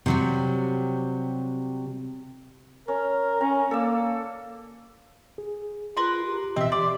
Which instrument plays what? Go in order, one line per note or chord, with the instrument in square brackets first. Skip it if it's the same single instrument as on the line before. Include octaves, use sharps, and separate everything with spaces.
[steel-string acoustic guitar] C3 F#3 G3
[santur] C#4 [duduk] A#4
[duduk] C#4 [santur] A#5
[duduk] A#3 [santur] A4 D5 E6
[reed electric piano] G#4
[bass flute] F4 [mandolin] A#4 B4 C6
[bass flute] G4
[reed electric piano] B2 E3 D#5 [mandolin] C4 E5
[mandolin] D5 [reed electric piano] C6 D6